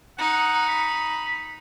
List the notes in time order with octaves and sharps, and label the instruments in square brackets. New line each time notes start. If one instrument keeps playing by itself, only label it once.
[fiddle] D#4 [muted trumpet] F#5
[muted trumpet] B5